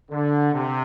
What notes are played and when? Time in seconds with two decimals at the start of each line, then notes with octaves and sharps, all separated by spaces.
0.11 D3
0.54 C3